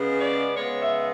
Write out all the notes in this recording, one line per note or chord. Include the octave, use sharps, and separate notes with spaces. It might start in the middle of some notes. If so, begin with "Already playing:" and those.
Already playing: C#3 G#3 B3
D5
C#3 G#3 B3 C#5
E5